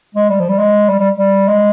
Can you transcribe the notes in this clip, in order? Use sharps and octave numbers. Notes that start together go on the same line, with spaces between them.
G#3
G3
F3
G3
G#3
G3
G3
G3
G#3